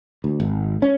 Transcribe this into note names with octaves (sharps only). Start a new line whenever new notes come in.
D2
G#1
C#4